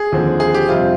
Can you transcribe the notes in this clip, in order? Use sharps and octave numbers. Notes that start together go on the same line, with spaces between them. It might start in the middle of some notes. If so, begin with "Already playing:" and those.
Already playing: G#4
D#2 D3 F3 C4
G#4
G4
F2 C3 G3 C4 F4